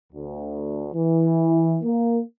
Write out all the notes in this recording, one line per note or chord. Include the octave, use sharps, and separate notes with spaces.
D2
E3
A#3